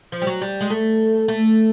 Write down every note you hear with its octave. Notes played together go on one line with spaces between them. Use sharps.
F3
G3
F#3
G3
G#3
A3
A3